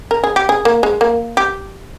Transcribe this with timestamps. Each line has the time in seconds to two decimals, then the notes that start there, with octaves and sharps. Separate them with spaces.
0.11 A#4
0.24 G#4
0.36 G4
0.49 G#4
0.65 A#3
0.83 G#3
1.01 A#3
1.37 G4